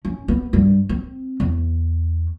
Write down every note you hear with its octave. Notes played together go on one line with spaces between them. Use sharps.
C#4
B3
G2
C4
E2